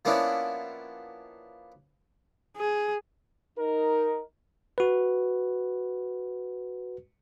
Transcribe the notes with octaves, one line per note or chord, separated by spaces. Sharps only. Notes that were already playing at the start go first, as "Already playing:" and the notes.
F3 A#3 B3 C#4 D4 E4
G#4
D#4 A#4
F#4 B4